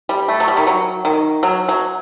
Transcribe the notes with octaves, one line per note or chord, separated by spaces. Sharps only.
G3
A3
F#3
G3
D#3
F#3
D#3
F#3
F#3